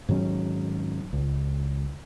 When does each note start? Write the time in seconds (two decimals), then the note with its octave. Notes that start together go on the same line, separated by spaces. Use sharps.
0.09 G#2 D#3 F#3 C#4
1.13 C#2